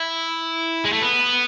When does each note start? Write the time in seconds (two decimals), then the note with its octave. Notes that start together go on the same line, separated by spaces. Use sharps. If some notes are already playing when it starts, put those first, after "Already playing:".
Already playing: E4
0.85 G#3
0.92 A3
1.02 B3